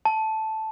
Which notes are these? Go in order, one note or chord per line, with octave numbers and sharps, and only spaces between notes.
A5